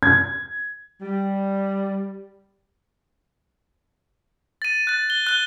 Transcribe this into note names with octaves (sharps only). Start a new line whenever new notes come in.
G#6
G3
A6 D#7
F#6 A6
G7
F#6 G7